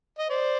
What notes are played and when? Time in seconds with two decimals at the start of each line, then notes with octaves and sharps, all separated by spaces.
0.18 D#5
0.29 C5 D5